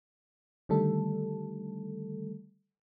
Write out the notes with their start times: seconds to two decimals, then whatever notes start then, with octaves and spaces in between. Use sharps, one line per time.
0.69 D3 D#3 G3 A3 A4